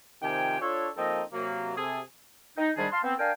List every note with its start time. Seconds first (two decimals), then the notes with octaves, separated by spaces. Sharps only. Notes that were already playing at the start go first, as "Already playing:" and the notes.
0.22 C3 D#3 F3 G4 G5 G#5
0.61 D4 F4 A4 C#5
0.97 F3 A#3 C4 D#4 A4 D#5
1.33 C3 F#3 A#3
1.76 C3 G#4 A4
2.58 D#4
2.77 G#2 D#3 G3 D4 G#4
2.92 F5 A5 C6
3.04 B3 C4
3.19 D4 A#4 F5 G5 G#5